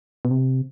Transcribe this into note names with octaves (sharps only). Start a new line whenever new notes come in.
B2
C3